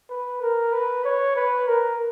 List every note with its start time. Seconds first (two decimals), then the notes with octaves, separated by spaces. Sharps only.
0.10 B4
0.42 A#4
0.73 B4
1.05 C#5
1.36 B4
1.68 A#4